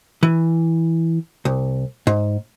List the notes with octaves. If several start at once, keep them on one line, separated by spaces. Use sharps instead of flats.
E3
C2
G#2